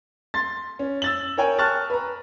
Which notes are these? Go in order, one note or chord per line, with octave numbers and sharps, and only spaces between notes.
C6 A6
C#4
E6 A6 F#7
A#4 C#5 G5 G#5
A5 C#6 F6 F#6 A6
B4 A#5